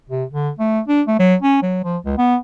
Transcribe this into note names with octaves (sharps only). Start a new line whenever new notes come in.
C3
D3
A3
D4
A3
F#3
C#4
F#3
F3
C#2
B3